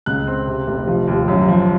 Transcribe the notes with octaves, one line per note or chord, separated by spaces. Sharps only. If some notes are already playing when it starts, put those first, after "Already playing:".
C#2 F#6
C4
C3
F1
F3
D#2
F#2
F3